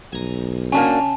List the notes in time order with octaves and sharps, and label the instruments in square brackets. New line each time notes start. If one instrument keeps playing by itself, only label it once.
[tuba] B1 [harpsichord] G#5 A#5
[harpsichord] C#3 C#4 [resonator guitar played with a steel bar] A#3 D4 F#4 [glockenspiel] G#5 A5